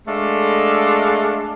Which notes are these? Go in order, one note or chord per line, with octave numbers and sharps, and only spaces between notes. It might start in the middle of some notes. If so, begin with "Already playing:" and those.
G#3 A3 D4 A4 F5